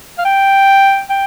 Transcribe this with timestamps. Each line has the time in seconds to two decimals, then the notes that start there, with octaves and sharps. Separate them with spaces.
0.18 F5
0.25 G5
1.10 G5